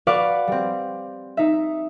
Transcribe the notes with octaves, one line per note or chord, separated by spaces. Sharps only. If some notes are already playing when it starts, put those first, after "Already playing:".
F#4 B4 D5 F5 C#6 D6
G3 C4
D#4 E5